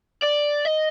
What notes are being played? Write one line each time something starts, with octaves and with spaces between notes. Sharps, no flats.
D5
D#5